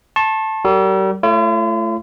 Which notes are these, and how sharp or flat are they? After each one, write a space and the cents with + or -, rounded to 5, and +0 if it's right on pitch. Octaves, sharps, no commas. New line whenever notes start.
A5 +0 C#6 -45
G3 -40 A#4 -35
A3 +0 F4 -45 C#5 +0